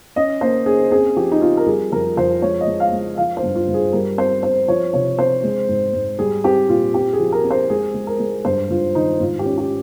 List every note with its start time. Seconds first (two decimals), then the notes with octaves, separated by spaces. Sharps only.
0.16 C#4 D#5
0.41 A#3 C5
0.66 C#4 G#4
0.92 C4 G#4
1.16 F3 G4
1.32 D#4
1.41 C4 F4
1.57 A#4
1.67 G3 G#4
1.92 F2 A#4
2.17 F2 C5
2.42 G#3 C#5
2.61 D#5
2.67 G#3
2.80 F5
2.92 G#3
3.17 F3 F5
3.37 C5
3.43 G2
3.55 F4
3.68 G2
3.74 G#4
3.93 G3 A#4
4.18 C4 C5
4.43 C4 C5
4.68 F3 C#5
4.93 C3 C#5
5.19 C4 C5
5.44 G#3
5.69 G#2
5.93 G#2
6.19 G3 G#4
6.44 C4 G4
6.69 A#2 F4
6.94 C4 G4
7.13 G#4
7.19 F3
7.32 A#4
7.44 C4
7.51 C5
7.70 G#3 G#4
7.94 G#3
8.07 A#4
8.20 G#3
8.45 G2 C5
8.70 G2 F4
8.95 D#3 D#4
9.20 G#2 F4
9.39 G4
9.46 C#4
9.58 G4